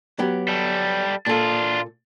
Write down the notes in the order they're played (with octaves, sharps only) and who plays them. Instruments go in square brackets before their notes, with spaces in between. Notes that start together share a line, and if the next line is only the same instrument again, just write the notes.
[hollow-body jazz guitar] F#3 B3 G4
[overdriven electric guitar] G3 A4
[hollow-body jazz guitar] A#2 A4 [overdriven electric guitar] D4 F4